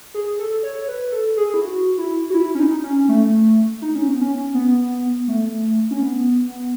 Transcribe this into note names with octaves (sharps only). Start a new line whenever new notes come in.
G#4
A4
C#5
C#5
B4
A4
G#4
E4
F#4
E4
F#4
E4
C#4
D#4
C#4
A3
D#4
C#4
B3
C#4
B3
A3
C#4
B3